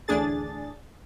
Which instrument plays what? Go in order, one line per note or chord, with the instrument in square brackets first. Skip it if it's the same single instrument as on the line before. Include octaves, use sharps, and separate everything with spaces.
[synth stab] A1 D2 A2 D4 G#4 A6